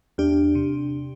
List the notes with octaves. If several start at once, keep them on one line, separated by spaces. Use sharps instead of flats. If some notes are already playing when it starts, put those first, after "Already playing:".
E2 D4 G4
C3